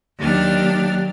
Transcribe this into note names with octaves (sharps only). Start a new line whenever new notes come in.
D#2 F#3 D4 G4 F6